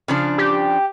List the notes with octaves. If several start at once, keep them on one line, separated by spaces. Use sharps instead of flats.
C#3 F3 D4
G4